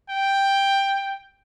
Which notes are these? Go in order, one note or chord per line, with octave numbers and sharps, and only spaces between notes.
G5